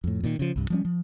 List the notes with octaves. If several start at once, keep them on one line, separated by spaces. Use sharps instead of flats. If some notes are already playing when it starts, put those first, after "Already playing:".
F2 A2
A#2 D#3
C#3 F3
C2 G2
F3 G3 C#4
F3